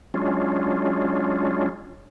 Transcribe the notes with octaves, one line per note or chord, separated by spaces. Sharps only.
F#3 G#3 C#4 D4 F4